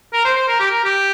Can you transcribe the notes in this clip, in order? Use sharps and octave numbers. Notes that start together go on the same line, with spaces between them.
A#4
C5
C5
A#4
G4
A#4
G4